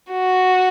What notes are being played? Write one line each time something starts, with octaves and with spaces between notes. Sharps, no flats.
F#4